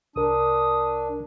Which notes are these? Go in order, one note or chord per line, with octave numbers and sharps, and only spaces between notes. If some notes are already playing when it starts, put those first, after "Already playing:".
C2 D4 A#4 D#6